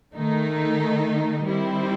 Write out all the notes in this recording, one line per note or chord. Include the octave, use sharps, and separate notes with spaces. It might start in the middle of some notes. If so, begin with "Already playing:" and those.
D#3 A3 D#4
D#3 G3 C4 E4